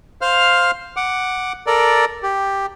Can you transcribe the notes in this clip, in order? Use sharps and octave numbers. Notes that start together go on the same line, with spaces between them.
C5 F5 F6
F#5 D6
A4 A#4 D5
G4